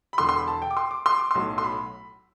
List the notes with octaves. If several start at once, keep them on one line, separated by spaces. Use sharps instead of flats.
B5
E1 E2 D3 C6
C6
B5
A5
G5
D6
C6
D6
C6
D6
B1 A2 F#3 C6
C6
B5